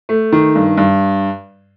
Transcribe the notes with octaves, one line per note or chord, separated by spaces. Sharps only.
A3
D#3
G2
G2